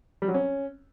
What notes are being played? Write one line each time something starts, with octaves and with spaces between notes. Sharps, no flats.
G3
F#3
C#4